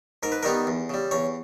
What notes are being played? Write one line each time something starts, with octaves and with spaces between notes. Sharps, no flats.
G#2 A#4
B4
D#3 G3 B3 D#4 A#4
E2
C#3 G3
E2 C#5